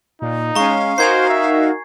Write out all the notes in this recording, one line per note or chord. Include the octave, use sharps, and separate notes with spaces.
A#2 D#4
G#3 C#4 F5 A#5 C#6
D#4 F#4 A#4 C5 G#5 G#6 C7
E5